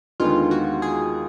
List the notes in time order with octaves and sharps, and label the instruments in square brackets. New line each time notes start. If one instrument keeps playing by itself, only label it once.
[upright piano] D#2 D3 G#3 B3 D#4 [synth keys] F4
[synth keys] F#4
G#4